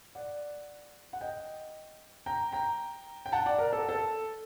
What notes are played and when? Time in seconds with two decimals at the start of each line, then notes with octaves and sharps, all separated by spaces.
0.15 D5 F#5
1.13 F#5
1.21 D#5 G5
2.26 G5 A#5
2.52 G5 A#5
3.26 G5
3.32 F#5 A5
3.46 D5 F#5
3.59 A#4
3.73 A4
3.89 A4